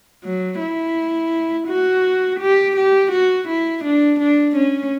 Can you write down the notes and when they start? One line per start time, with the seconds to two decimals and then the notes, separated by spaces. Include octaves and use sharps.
0.24 F#3
0.60 E4
1.68 F#4
2.40 G4
2.76 G4
3.12 F#4
3.48 E4
3.84 D4
4.20 D4
4.56 C#4